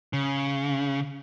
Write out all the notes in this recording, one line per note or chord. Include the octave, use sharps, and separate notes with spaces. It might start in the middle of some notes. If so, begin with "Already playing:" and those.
C#3